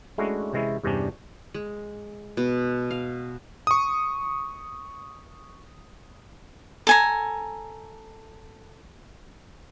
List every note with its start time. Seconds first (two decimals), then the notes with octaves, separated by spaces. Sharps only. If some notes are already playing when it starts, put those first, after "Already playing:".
0.18 G#3 A3 C#4 D4 E4 F#4
0.53 C3 E3 G#3 C#4 E4
0.84 E2 G2 C3 G3 C#4 D4
1.54 G#3
2.37 B2
2.91 F5
3.67 C#6 D#6
6.87 A4 G#5 A#5